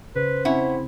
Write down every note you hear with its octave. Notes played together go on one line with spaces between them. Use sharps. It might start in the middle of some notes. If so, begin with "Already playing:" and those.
C#3 B4 C5
C4 C#4 E4 E5 F#5